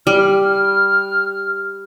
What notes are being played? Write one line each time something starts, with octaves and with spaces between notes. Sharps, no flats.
G3 F6